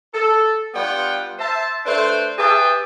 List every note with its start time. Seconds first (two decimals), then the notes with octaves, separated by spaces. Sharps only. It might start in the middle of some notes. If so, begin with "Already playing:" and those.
0.14 A4
0.74 G3 B3 D4 F4 F#5 G5
1.39 C5 E5 A5
1.86 A3 D4 B4 C5
2.38 G4 G#4 B4 E5 G5 A5